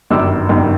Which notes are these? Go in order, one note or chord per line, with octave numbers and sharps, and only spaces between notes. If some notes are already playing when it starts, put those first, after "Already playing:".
G1 F#2 D#3 G3 D6 E6
G1 F#2 D#3 G3